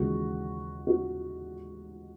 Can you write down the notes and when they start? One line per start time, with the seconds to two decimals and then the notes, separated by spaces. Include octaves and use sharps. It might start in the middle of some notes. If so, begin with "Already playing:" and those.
Already playing: D#2 C#3 E3 G#3 F#4
0.87 F#4